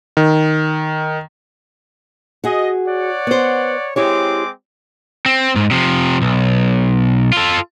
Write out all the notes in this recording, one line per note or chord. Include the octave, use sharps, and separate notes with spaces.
D#3
F#4 G#4 D#5
C#5 D5 F#5
B3 C5
G#3 C4 E4 G4 C#5 D6
C4
G#2
C3 F3
B1
F4 A4